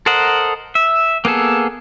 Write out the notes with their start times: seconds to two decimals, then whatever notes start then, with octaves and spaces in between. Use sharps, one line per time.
0.06 A4 A#4 C5 D#5 F#5
0.75 E5
1.25 A#3 B3 G#4 A4